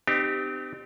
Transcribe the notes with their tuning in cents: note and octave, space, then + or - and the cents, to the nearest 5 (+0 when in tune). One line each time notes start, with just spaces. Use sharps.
C4 -35 D#4 -45 G4 +0